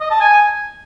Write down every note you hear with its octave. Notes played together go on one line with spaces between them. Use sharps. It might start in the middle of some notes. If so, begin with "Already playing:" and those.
D#5
A5
G#5